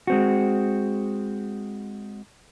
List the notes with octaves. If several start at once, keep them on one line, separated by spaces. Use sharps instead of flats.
G#3 C4 F#4